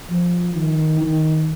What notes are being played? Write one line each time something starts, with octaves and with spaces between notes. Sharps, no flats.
F3
D#3
D#3